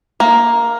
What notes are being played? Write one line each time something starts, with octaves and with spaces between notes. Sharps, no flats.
A#3